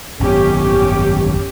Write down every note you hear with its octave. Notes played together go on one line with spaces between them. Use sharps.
G#1 F#2 B3 C#4 G4